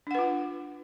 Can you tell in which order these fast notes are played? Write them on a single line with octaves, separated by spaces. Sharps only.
D4 F#5 B4 F4